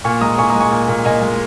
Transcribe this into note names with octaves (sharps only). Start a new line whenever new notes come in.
A#2 G#5 C#6
G#3 A#5 D#6
A#2 G#5 C#6
A#5 D#6
G#3
G#5 C#6
A#2
A#2
A#2 D#5 G#5
G#3